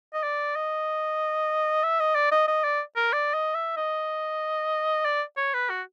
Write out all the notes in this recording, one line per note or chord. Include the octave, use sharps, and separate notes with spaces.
D#5
D5
D#5
E5
D#5
D5
D#5
D#5
D5
A#4
D5
D#5
E5
D#5
D5
C#5
B4
F#4